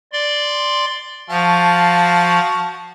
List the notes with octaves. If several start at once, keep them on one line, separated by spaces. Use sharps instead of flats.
D5 C6
F3 F#4 F5 A5